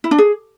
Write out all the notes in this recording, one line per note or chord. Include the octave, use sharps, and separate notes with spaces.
E4
D4
G#4